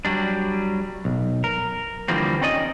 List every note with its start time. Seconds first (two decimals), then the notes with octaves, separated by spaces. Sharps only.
0.05 F#3 G3 D4
1.05 B1
1.44 A#4
2.08 D3 E3 F3 G3 A#3 C4
2.41 C4 C#4 D#4 D5 D#5